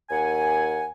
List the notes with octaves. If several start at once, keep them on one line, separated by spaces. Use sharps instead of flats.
D#2 F#5 G#5